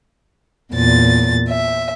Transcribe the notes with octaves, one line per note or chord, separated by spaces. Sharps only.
E2 A#2 A6
E5